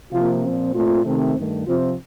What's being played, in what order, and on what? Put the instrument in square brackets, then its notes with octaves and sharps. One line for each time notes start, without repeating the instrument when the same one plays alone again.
[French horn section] C3 F3 A#3 F4
A#2 F3 C4
A#2 A3 C4 F4
C3 D#3 A3 C4
G2 D#3 A3
C3 F3 C4 F4